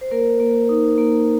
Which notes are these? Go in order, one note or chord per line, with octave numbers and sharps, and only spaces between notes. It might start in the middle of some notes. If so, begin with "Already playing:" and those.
C5
A#3 A#4
A#3
D#4
A#3